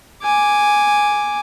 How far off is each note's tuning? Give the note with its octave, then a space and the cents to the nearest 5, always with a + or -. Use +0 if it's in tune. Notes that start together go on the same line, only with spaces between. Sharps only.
G#5 +0 D6 +0